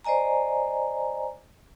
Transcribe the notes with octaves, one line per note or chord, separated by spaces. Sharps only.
C5 D5 D#5 G#5 A#5